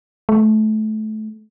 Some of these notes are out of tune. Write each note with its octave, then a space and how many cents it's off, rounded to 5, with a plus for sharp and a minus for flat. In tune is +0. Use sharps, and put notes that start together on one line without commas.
A3 -25